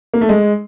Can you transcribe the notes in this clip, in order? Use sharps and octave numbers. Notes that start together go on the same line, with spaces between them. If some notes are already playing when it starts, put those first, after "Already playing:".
A#3
A3
G#3